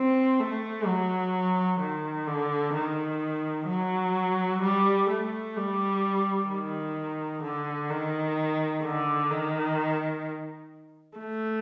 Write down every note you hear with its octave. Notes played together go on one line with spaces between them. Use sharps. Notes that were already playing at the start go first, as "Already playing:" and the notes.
Already playing: C4
A3
F#3
D#3
D3
D#3
F#3
G3
A3
G3
D#3
D3
D#3
D3
D#3
A3